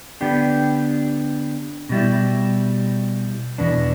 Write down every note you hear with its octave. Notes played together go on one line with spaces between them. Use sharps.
D3 B3 D4 G4
B2 G3 E4
E2 B2 B3 D4